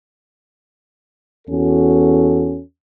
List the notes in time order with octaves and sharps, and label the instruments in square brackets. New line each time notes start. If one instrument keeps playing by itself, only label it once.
[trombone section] E2 C#4 F#4 A4